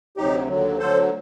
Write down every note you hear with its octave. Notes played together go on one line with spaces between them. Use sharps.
D2 C3 F#3 D#4 G4
D#2 D3 F#3
D2 D3 F#3 A4 C5